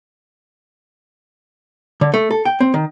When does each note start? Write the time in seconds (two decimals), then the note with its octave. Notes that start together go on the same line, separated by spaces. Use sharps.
2.01 D3
2.14 A3
2.31 A4
2.45 G5
2.60 C4
2.74 D#3